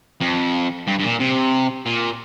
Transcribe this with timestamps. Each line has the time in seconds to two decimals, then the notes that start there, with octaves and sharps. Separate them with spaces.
0.21 F2
0.87 G2
0.99 G2
1.04 A#2
1.20 C3
1.86 A#2